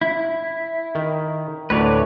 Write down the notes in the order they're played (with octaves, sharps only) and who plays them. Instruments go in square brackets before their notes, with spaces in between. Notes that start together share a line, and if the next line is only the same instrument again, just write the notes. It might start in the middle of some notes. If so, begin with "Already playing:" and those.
[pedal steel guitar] E4
[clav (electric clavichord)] D#3
[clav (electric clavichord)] D2 A2 [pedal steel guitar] B4 C#5 D5